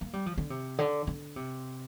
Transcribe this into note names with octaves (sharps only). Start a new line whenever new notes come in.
A#3
G3
F3
D3
C3
D3
D3
C3